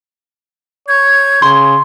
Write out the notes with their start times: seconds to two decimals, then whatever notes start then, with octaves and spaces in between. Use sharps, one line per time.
0.88 C#5 G6 G#6
1.42 C#3 C6